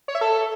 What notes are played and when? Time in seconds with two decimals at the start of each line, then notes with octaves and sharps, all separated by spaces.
0.08 C#5
0.15 E5
0.21 A4